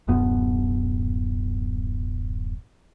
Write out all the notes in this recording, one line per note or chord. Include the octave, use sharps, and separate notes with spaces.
D1 F#2 B2 B3